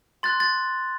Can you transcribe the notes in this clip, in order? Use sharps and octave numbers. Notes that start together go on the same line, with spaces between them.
C6 F#6 A6
A6